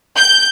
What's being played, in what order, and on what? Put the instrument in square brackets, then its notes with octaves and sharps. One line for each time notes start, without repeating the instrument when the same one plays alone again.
[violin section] G6